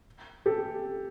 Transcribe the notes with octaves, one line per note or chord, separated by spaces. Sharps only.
G4 A4